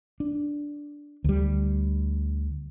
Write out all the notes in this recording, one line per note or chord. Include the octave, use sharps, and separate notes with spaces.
D4
D2 G3